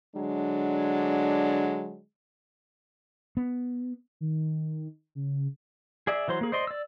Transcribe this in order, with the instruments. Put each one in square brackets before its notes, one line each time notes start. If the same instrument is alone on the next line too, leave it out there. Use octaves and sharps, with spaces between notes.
[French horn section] D3 F#3 G#3 D4
[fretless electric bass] B3
[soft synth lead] D#3
C#3
[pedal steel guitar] G#4 D5 E5
E3 F#3 C5 C6
A#3 G#4
C5 D5 D#5 C6
D5 E6